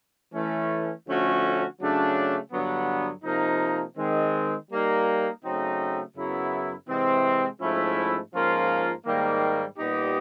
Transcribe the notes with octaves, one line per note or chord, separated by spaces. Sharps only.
E3 A3 C#4
D3 F3 A3 C#4 F#4
C#3 F#3 A3 D4
G2 D3 F#3 B3
C3 F3 A#3 D#4
D#3 G#3 C4
G3 A#3 D#4
C#3 F#3 A3 C4 D#4
F#2 C#3 F#3 B3 E4
C3 E3 G#3 C4
G#2 F3 A3 C#4 E4
G#2 F3 A#3 C#4 F4
G#2 D#3 G3 A#3
A#2 G3 B3 D#4 G4